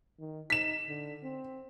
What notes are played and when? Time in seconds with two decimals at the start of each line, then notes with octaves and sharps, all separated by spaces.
0.20 D#3
0.50 D#4 B6 E7
0.88 D3
1.23 C4